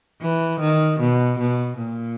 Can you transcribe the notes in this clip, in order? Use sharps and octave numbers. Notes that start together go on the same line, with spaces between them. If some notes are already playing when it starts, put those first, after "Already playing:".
E3
D#3
B2
B2
A#2